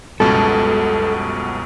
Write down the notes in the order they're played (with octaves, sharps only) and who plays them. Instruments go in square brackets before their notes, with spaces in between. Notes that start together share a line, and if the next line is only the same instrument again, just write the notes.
[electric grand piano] C#2 B2 [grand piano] F#2 G3 [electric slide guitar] A4